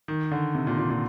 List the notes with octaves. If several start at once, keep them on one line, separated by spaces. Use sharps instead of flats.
D#3
D3
C3
A#2
A#2
A#2